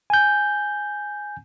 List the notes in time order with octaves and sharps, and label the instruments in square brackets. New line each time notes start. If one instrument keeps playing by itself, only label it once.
[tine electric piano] G#5 G6